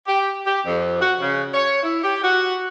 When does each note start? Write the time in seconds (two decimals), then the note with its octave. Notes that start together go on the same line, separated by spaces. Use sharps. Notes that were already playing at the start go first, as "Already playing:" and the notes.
0.07 G4
0.46 G4
0.66 F2
1.01 F#4
1.21 C#3
1.54 C#5
1.83 E4
2.04 G4
2.22 F#4